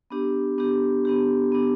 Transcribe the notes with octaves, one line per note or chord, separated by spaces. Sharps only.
B3 D4 G4
B3 D4 G4
B3 D4 G4
B3 D4 G4